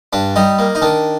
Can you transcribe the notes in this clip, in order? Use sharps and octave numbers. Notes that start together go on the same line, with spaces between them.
G2 D4
G3 D#4
A#3
D#4
D#3 D4